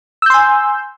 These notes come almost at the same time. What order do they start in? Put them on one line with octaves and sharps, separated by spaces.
E6 G6 C6 G#5